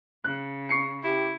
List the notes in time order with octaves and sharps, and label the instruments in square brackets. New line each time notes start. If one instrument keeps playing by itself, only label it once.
[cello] C#3 [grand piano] F#6
[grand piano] C#6 C7 C#7
[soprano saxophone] E4 [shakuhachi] G4